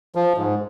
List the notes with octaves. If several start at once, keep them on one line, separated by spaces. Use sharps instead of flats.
F3
G#2